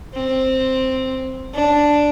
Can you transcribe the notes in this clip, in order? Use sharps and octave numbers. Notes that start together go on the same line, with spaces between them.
C4
D4